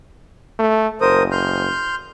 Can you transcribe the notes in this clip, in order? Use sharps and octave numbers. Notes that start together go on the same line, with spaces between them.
A3
F#1 A#4 C5 D#6
C6 F6 G6